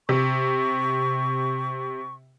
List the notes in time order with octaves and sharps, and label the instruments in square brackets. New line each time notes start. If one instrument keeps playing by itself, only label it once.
[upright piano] C3 [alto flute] C#6